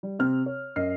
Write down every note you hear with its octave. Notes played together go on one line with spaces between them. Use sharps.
G3
C3 C4 F6
C#5
F#2 D#5 F6 C7